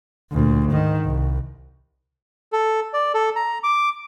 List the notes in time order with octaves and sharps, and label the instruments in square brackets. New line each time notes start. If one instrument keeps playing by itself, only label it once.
[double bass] D2 A#2
G#2 D#3
C2
[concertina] A4
D5
A4
A#5
D6